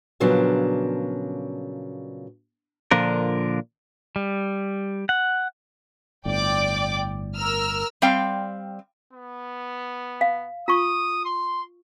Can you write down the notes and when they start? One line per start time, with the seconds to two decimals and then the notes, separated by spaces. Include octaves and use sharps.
0.20 A#2 C#3 F3 F#3 B3 D4
2.91 A#2 D3 F3 D4 A#4
4.16 G3
5.09 F#5
6.25 G1 A2 D5 G5 D6
7.35 A#4 E6 F6
8.02 G3 C4 F5 G5
9.13 B3
10.21 F5
10.68 F4 C#6 D#6
11.25 C6